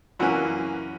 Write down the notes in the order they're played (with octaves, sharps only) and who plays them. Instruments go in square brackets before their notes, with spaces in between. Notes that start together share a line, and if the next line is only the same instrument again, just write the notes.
[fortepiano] F#2 E3 A#3 C#4 F#4